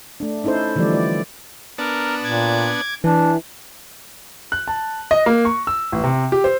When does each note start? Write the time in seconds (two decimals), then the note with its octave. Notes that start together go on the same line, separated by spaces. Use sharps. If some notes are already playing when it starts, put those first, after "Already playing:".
0.20 A3 D4
0.44 C#4 D#4 E4 A4 C5
0.76 D3 E3 F3 G3 A3 D5
0.92 A3 D5
1.78 B3 D4 A#4 A5
2.24 A#2 D6 G#6
3.04 E3 D4
4.52 F#6
4.68 A5
5.11 D#5
5.26 A#3
5.45 C#6
5.67 E6
5.92 A1
6.04 C3
6.32 G4
6.44 C5